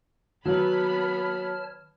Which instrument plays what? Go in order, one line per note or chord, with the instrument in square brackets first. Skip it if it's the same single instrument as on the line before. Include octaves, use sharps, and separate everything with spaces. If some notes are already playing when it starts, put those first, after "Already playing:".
[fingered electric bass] D#3 [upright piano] F#3 [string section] B3 B5 [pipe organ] C#5 A5 F6